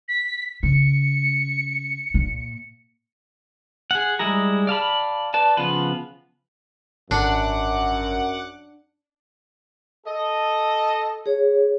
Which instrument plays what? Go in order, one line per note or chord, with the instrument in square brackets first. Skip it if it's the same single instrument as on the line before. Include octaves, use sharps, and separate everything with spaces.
[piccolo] B6
[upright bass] C#3 [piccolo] C#7
[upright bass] A#2
[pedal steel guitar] G#4 F#5
G3 G#3 E4 G#4 A#5
D5 F5 A5 B5
B4 D5 A5
C#3 F3 B3 F4 B4
[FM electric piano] G#1 [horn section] F#2 [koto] D4 [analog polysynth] F#5 D6
[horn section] A4 D#5
[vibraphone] G#4 C#5